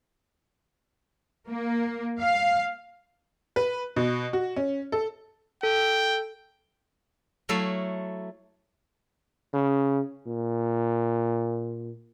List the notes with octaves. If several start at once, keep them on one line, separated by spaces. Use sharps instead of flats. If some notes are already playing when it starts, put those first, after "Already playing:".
A#3
F5
B4
B2
F#4
C#4
A4
A4 G5
F#3 A3 E4 A4 F5
C#3
A#2